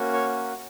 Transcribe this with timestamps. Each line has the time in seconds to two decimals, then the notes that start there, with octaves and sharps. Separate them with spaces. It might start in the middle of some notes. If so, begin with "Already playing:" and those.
Already playing: A#3 C#4 F#4
0.13 C#5